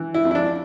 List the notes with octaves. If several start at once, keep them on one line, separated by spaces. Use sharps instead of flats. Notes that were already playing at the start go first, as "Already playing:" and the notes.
Already playing: E3
E4
F2
E4
D4